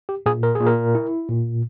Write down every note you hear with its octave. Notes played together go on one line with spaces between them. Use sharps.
G4
A#2 G#4
A#4
A#2 G#4
A#4
E4
A#2